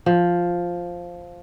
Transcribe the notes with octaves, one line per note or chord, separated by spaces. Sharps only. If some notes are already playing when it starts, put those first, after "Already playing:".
F3